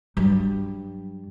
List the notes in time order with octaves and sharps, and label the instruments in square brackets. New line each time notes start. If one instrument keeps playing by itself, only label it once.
[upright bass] G2 F#3